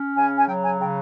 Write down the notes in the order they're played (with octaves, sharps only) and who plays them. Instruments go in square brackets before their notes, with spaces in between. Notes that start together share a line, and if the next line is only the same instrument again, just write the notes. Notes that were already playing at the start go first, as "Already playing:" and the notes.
Already playing: [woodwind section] C#4
[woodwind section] C#3 [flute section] G#5
[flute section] G#5
[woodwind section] F#3 [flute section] G5
[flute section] G#5
[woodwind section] C#3 [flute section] G5